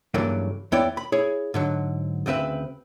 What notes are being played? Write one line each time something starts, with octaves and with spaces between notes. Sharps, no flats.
G2 C#3 E3 F#3 A3 A#3
E2 B3 E4 C#5 D5 G5
B5
E4 G#4 C#5
G#2 D3 F#3
D2 C#3 C4 B4 E5